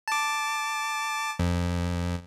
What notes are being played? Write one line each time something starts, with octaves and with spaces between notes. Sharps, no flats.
A5 D6
F2